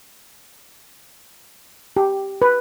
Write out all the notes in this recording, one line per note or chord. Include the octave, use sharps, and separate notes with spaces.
G4
B4